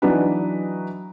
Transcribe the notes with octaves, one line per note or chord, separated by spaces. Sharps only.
E3 F#3 D4 D#4 F#4 B4